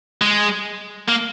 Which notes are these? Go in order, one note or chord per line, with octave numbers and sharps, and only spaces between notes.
G#3
A#3